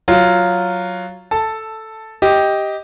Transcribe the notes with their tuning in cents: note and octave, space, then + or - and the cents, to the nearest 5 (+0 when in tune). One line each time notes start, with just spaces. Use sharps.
F#3 +0 F4 +0
A4 +0 A5 +5
G4 +0 D#5 +10